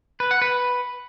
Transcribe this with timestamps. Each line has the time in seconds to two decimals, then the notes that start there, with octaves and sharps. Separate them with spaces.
0.20 B4
0.31 F#5
0.42 B4